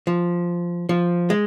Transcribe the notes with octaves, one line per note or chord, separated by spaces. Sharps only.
F3
F3
G#3